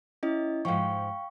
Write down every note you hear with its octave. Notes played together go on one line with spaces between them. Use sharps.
C#4 E4 D#5
G#2 F3 F5 G5 C#6